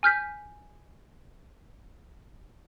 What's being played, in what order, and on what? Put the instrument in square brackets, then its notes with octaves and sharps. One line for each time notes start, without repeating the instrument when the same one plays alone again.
[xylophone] G#5 F6 G6 B6